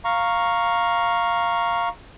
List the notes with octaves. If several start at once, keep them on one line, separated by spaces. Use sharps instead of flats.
F5 A#5 C#6